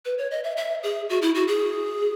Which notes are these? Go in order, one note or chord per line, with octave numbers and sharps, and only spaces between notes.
B4
C#5
D#5
E5
E5
G#4
F#4
E4
F#4
G#4